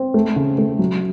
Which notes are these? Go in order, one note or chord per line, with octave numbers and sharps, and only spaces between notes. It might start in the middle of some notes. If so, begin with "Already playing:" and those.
Already playing: C4
A3
C#3
A3
F#3